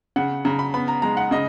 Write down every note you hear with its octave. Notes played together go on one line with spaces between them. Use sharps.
C#3 F#5
C#3 A#5
B5
B3 B5
A#5
G#3 A#5
F#5
C#3 D#5